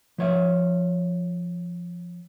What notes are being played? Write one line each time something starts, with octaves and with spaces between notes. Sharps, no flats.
F3 C#5 E5